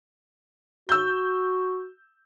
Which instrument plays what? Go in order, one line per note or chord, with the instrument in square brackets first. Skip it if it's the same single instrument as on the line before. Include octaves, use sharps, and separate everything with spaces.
[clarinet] F#4 [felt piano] E6 G6